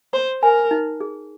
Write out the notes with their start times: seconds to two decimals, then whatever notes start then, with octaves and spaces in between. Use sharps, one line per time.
0.13 C5 C6
0.42 A#4 G#5
0.71 D#4
1.00 G#4